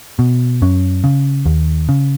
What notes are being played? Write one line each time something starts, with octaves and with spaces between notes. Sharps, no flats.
B2
F#2 C#4
C#3
D#2
C#3